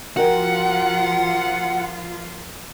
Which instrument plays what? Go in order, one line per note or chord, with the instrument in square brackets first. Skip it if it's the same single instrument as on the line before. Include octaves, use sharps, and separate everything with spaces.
[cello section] F3 F4 [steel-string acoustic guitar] F#4 A#4 G5 [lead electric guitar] F#5